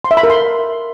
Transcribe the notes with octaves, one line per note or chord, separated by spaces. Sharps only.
C6
E5
B5
A#4
C6